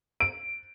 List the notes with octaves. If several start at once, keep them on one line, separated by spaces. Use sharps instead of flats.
D7